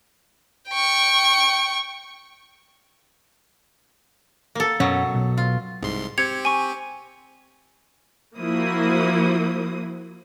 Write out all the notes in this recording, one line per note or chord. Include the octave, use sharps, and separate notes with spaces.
G5 C#6
A#3 A4
F#2 B2 F#3 B3 C#4
B1
F4
C2 G#2 C6
C4 G4 G#6 C#7 F7
G#5 C#6
F3 A#3 E4 F#4 C5 D#6